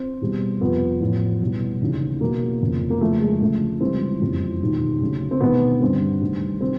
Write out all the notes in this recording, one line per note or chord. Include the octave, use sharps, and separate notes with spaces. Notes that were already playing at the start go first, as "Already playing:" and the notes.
Already playing: C4
E2 B2 G3
F2 C3 F3 B3
A1 A2 F3
C2 B2 F#3
F1 D#2 C#3 E3
E2 B2 F#3 A#3
F1 F2 C#3
A#3
E2 C#3 F3 A3
G#3
D2 C#3 F3 A3
C#2 C3 E3 G3 C4
F#1 F2 C#3 E3 G3
E1 D#2 D#3 F#3
D2 C#3 F#3
C4
E1 D2 C3 D#3 B3
G1 G2 D3 G3 C4
D2 C3 D#3 G3
C3 D#3 C4